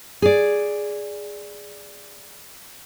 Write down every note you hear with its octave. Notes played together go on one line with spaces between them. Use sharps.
G#4 D5